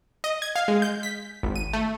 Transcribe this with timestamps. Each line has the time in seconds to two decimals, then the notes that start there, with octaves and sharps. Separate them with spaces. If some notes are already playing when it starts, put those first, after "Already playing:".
0.24 D#5
0.42 G#6
0.56 F5
0.68 G#3
0.82 G6
1.03 B6
1.43 G#1
1.56 D#7
1.73 A3